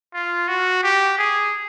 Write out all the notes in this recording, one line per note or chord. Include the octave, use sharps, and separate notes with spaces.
F4
F#4
G4
G#4